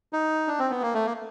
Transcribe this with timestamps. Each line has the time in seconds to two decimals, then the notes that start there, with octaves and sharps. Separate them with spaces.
0.13 D#4
0.47 D4
0.59 C4
0.70 B3
0.82 A#3
0.94 A3
1.06 A#3